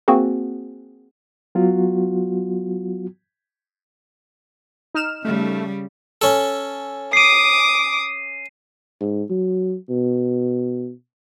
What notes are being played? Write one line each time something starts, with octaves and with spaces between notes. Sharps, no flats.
A#3 C4 F#4 G#4
F#3 B3 F4 F#4
D#4 F6 E7
C#3 G3 A3
C#4 A4
D6 D#6 C7 D#7
G#2
F#3
B2